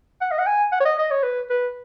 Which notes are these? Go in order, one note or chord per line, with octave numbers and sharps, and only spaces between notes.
F#5
D#5
F#5
G#5
F#5
C#5
D#5
D#5
C#5
B4
B4